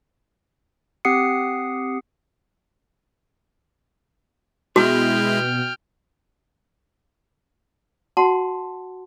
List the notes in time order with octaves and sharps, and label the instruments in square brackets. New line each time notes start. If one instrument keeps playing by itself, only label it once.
[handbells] C4 G4 F#5 D#6 C7 C#7
[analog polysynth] B2 [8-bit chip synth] G#3 E4 [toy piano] F#4 [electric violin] G5 F6
[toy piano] F#4 F#5 A5 C6